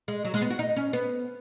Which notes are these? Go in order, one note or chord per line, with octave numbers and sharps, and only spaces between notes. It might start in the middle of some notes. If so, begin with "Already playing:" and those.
G#3
F#3
G#3
B3
F#4
D#4
C#4
B3